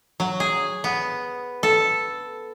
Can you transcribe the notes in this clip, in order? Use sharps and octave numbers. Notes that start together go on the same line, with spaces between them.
F#3
G#4
B3
A4